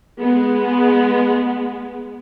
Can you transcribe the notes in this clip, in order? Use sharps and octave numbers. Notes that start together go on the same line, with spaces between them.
G#3 B3